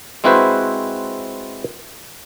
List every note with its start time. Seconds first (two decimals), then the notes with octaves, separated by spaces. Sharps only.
0.24 G#3 C4 E4 F#4 B4 C5